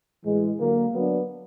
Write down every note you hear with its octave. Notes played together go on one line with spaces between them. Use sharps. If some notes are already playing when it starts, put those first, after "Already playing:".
A2 E3 G#3
D3 F#3 A#3
F#3 B3 D4